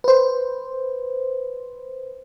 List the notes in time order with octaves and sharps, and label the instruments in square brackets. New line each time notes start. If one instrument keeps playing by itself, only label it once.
[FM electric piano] B4 C5